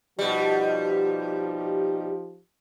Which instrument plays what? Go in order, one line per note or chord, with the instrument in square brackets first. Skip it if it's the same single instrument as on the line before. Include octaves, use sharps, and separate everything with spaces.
[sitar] B2 G3 [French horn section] F3 D#4 G4